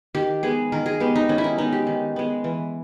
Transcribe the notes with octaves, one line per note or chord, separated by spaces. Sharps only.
D#3 G4
G#3 B3 G#4
D#3 A#4
G#4
G#3 B3 G4
D#4
D#3 C#4
E4
D#4
G#3 B3 D#4
G4
D#3
G#3 B3
E3